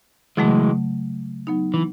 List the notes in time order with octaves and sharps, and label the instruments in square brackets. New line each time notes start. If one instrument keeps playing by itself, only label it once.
[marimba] C#3 F#3 A3 [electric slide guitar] E3 G#3
[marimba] F#3 B3 D#4
[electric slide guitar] E3